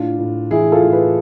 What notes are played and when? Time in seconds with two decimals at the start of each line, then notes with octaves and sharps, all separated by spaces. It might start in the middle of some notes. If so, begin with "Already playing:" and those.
Already playing: A2 D4 F4
0.19 A2
0.51 E3 E4 G#4
0.72 F4 A4
0.83 A2
0.92 G#4 B4